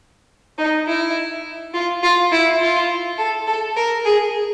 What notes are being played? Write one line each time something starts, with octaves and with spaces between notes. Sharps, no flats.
D#4
E4
F4
F4
E4
F4
A4
A4
A#4
G#4